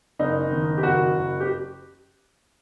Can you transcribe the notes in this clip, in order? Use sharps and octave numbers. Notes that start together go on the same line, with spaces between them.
F#1 D#4
D#3
G4
F#1 F#4
F#1
G4